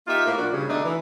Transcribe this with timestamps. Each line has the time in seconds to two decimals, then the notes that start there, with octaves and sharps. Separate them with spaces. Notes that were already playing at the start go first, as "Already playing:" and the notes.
0.07 A#3 D#4 F4 G4 E5
0.26 A2 A#3
0.38 A#2 F3 A#3 D4 F#4
0.52 G2 C#3
0.68 B2 D3 A3 D4 D#4
0.84 E3